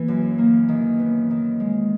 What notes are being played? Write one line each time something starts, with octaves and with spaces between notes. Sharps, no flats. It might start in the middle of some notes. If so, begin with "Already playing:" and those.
Already playing: E3 A#3
F#2
A#3
D#3
B3
D#3
G#3